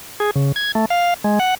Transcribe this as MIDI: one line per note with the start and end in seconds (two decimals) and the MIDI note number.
0.20 0.31 68
0.36 0.52 49
0.56 0.72 92
0.75 0.85 57
0.90 1.14 77
1.24 1.39 56
1.40 1.55 78